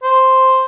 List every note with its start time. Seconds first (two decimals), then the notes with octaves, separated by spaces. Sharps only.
0.03 C5